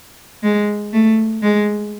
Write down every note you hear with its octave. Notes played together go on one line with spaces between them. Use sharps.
G#3
A3
G#3